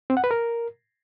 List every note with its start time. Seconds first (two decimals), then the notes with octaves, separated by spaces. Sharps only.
0.10 C4
0.17 F#5
0.24 B4
0.31 A#4